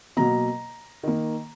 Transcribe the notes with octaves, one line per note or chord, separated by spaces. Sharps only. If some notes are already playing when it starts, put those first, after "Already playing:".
B2 F#3 A#3 A#5
D#3 A#3